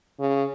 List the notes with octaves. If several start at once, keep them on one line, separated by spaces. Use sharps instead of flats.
C#3